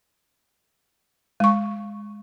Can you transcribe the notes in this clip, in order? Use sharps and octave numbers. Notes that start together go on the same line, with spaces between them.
G#3 C#6